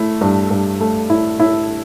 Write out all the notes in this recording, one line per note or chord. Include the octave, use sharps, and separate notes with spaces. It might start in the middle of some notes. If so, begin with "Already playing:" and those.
Already playing: A3 E4
G2
G2
A3
E4
E4